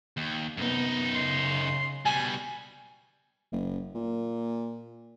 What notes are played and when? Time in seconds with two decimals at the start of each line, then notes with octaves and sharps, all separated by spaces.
0.17 D#2
0.57 F#2 C3 B3 D#4
1.15 C#3 C6
2.05 B2 G3 G#5
3.52 F#1
3.95 A#2